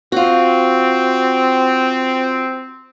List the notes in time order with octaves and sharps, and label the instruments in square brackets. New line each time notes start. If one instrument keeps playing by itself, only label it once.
[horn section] C4 [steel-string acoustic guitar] F4 F#4